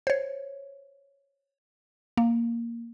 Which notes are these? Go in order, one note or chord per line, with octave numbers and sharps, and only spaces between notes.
C5 C#5
A#3